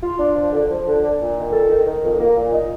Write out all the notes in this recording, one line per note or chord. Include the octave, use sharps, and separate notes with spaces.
F4
D4
F3
D3
F3
D3
D4
A#2
D#3
A4
D#3
D#3
F2
A#3
A#2
D#4